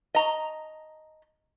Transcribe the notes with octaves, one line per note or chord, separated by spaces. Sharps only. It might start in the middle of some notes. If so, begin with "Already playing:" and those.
D#5 A#5